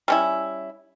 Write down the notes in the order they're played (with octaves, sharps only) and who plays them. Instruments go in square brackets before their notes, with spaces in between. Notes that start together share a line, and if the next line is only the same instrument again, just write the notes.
[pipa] G3 C#4 E4